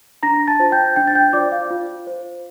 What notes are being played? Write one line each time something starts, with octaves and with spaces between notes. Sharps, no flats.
D4 A#5 A#6
A5 A6
F4 C5
G5 G6
D4 G5 G6
A6
G5 G6
F4 C5 D5 D6
F5
F4
C5